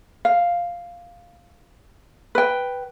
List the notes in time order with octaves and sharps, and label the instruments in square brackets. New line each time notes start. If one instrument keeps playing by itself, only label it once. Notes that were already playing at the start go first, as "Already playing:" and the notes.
[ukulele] F5
B4 G5